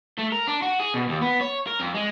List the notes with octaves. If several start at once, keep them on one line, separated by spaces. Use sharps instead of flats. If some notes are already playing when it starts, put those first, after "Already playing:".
A3
A#4
D4
F#4
G#4
B2
D#2
B3
C#5
A#4
F2
G#3